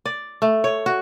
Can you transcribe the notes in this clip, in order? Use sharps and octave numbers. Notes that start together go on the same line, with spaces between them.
D5
A3
C#5
F#4